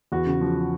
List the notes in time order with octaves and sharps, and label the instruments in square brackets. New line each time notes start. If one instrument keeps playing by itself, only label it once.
[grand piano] E2 F#4
C#3
F3